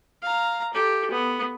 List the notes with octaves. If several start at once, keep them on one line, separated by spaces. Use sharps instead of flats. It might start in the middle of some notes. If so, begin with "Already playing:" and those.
F5 A#5
G4 A4
B3